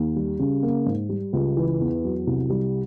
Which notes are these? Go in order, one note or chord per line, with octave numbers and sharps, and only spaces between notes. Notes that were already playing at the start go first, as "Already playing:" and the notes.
Already playing: D#2
G3
C#3
A#3
G#2
G3
C#2
E3
E2
F#3
C2
G3